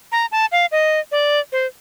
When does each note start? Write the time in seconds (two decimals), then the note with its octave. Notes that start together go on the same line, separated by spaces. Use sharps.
0.12 A#5
0.32 A5
0.52 F5
0.72 D#5
1.12 D5
1.52 C5